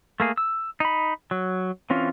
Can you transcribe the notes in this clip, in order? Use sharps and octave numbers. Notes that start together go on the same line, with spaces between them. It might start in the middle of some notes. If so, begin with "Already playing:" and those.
A3 A#3 G#4
E6
D#4 B5
F#3
E3 C4 C#4 F4